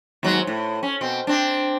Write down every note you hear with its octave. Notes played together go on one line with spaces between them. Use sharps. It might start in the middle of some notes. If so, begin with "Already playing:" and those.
D#2 G#2 F#3
A2
C#4
B2 C4
C4 D4